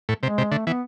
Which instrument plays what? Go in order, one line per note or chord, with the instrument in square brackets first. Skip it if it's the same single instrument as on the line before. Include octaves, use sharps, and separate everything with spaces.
[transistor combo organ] A2
[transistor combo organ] C3 [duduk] G#3
[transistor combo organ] C3
[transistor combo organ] D3 [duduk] A3
[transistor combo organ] E3 [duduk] B3